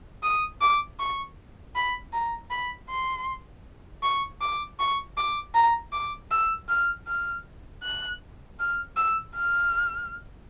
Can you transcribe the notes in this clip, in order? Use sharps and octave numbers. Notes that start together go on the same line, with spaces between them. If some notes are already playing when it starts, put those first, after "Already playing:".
D#6
D6
C#6
B5
A#5
B5
C6
C#6
D6
C#6
D6
A#5
D6
E6
F6
F6
F#6
F6
E6
F6